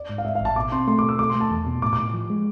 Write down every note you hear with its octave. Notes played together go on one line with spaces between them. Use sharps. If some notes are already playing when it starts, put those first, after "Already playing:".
Already playing: D5
G#2
F5
G#2 E5
F5
A1 A5
B2 D6
C4 C6
A3 C6
B2 D6
E6
A3 D6
C6
A3
A5
E2
B2
A2 D6
D6
A2
F3
G#3